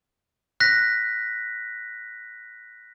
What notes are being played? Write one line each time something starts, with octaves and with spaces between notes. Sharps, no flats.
F#6 A#6 B6